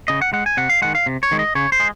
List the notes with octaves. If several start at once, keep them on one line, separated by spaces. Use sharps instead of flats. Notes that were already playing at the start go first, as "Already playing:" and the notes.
C#3 D#5
F#5
G#3 F#5
G#5
C3 F#5
F5
D#3 G#3 F#5
F5
C3
C#5
D#3 G#3
D#5
C#3 C#5
C5
G#3